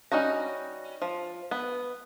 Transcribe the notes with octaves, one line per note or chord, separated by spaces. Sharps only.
G3 C#4 D#4 F#4 A#5
F3
B3